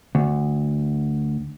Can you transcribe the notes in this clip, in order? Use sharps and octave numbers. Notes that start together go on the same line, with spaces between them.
D2